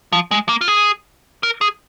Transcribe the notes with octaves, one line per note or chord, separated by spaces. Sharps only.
F3
G#3
A#3
F4
G#4
A#4
G#4